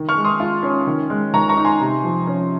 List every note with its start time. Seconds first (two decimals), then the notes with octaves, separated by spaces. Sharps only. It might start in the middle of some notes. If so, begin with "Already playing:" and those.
Already playing: D#3
0.09 C#6 F6
0.17 G#3
0.24 C6 D#6
0.40 F4
0.63 C#4
0.87 D#3
1.10 G#3
1.33 D#3 A#5 C#6
1.49 A#5 C#6
1.57 D#4
1.65 G#5 C6
1.80 C3
2.04 F3
2.27 C#4